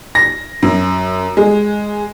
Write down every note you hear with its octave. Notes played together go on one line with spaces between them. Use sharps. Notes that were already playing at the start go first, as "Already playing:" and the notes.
A#6
F#2
G#3